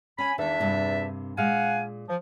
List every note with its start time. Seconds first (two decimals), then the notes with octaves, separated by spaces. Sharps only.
0.18 C#4 G#5 B5
0.38 E2 D#3 A#3 D4 E5
0.60 G2 C3 A#3
1.37 A#2 G#3 F5 F#5 G#5
2.08 F3